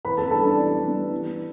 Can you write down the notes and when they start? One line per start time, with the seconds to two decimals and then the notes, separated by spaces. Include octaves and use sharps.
0.05 E3 B4 B5
0.17 A4 A5
0.31 G3 B3 D4 A4 A5
0.44 D4 D5
0.58 E3
0.84 G3 B3 D4
1.11 E3